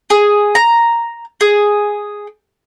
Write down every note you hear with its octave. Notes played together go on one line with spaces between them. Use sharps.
G#4
A#5
G#4